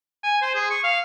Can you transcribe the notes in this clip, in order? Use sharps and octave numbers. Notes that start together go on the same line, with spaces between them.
G#5
C5
G#4
C#6
F5